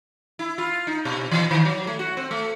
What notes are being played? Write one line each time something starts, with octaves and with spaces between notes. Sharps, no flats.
E4
F4
D#4
B2
E3
D#3
F#3
A3
F#4
C4
A3